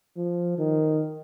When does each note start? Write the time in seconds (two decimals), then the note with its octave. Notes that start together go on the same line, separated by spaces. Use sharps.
0.17 F3
0.58 D#3